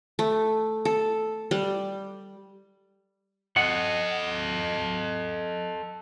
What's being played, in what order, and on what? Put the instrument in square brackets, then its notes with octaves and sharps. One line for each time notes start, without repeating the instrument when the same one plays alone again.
[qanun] A3
A4
G3
[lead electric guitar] A4 D#5 [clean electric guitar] F#5